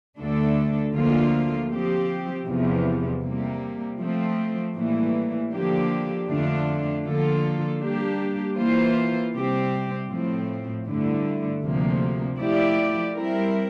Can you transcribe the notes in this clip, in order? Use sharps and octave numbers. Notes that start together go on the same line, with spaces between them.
D2 D3 A3 D4 A4
D2 D3 F3 A#3 F4
F3 C4 G4
E2 C3 F3
C3 G3 A#3
F3 A3 C4
A2 E3 G3 A#3
D3 F3 A#3 D4 G4
F2 D3 A3 D4 F4
D3 F3 A#3 F4 A4
G3 A#3 D4 G4
E3 A#3 F4 C5
C3 G3 C4 G4
A2 F3 C4
G2 D3 A3 E4
D2 C3 F3 A#3
F3 A3 E4 G4 D5
G3 C4 E4 A#4